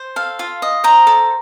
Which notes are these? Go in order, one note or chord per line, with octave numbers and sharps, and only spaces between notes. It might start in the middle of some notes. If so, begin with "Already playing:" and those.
Already playing: C5
A4 F5
F4
D#5
C5 A#5
A4